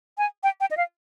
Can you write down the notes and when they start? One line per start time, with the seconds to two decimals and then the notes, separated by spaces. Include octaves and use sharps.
0.18 G#5
0.43 G5
0.61 G5
0.71 D#5
0.77 F5